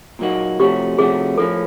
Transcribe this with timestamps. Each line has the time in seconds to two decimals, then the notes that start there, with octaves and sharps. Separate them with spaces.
0.19 A#2 F#3 A#3 D#4 F#4
0.59 C3 F3 A3 C#4 F#4 G4
0.98 C3 F3 A3 C#4 F#4 G#4
1.38 A2 F3 A#3 C#4 A4